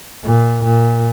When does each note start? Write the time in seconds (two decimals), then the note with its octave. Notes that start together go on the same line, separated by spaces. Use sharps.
0.24 A#2
0.63 A#2